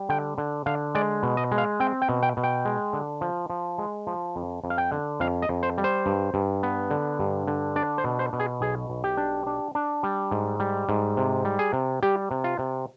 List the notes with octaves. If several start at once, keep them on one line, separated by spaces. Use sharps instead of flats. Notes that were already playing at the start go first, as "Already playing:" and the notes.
Already playing: G3
D3 G5
D3
D3 F5
G#3 D5
B2
D#5
G#3
F5
C4 G5
G5
B2
G5
B2
G5
G#3
D3
F3
F3
G#3
F3
F2
F2
F5
G5
D3
F2 F5
D#5
F2
C5
G3
C5
G2
G2
B3
D3
G2
D3
D4 D5
C5
B2
C5
B2
G#4
B1 G#4
B1
G4
D4
D4
D4
G3
G#2
G3
G#2
C3
G3
G#4
C3
G3 G4
C3
F4
C3